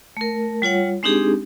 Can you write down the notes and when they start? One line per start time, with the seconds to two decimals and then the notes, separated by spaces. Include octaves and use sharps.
0.17 A3 A#4
0.62 G3 F4 C#5 F#5
1.03 G#3 C4 D4 D#4 G4 G#4